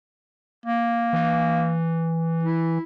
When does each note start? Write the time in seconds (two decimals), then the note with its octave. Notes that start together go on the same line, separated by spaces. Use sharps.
0.66 A#3
1.13 E3
2.43 E4